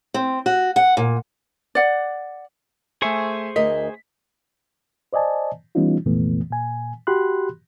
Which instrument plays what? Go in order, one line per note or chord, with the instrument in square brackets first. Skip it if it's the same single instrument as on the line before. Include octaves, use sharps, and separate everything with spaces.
[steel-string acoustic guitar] C4
F#4
F#5
A#2
[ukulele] D5 F#5
[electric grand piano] A3 E5 G#5 [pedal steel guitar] G#4 C5 C#6
[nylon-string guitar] D2 A#4 D#5 [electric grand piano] B6
[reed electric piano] C5 D5 D#5 G#5 A5
E3 G3 B3 C#4 D#4 F4
C2 F2 A#2 E3 A3 B3
A#2 G#5
F#4 G4 B5 C6 F#6